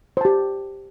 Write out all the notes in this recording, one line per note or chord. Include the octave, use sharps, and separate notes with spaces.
G4 C5 A5